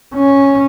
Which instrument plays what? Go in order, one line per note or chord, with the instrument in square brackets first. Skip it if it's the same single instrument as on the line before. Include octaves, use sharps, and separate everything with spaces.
[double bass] C#4